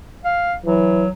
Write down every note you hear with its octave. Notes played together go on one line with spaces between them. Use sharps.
F5
E3 F#3